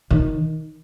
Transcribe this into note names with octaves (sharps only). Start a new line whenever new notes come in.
D#3